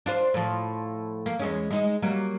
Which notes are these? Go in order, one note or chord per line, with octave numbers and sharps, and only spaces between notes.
D4 F4 C5
A2 F3
A#3
E2 G#3 C#4
G#3 D#4
F#3 G3 A#3